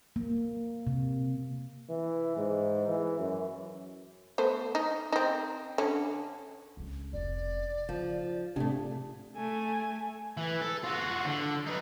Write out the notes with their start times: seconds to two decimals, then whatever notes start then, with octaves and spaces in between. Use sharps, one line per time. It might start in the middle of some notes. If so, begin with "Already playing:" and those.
0.16 A#3
0.87 C3
1.89 E3
2.37 G#2
2.88 E3
3.19 F#2
4.38 A3 B3 C5
4.75 D#4
5.12 C4 D#4
5.78 D3 C#4
6.77 C#2 C#4
7.13 F1 D5
7.89 C#3 F3 D#4
8.56 A2 C3 A3 D4 G#4
9.36 A3 G#5
10.37 E3
10.61 A4
10.83 F4 F#4
11.25 D3
11.67 D#4 B4